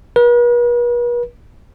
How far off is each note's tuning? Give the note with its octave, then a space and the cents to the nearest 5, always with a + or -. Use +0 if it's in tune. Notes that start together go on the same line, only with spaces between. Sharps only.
B4 -45